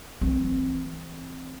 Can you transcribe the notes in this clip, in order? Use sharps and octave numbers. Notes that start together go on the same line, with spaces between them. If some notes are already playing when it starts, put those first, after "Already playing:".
E3 C4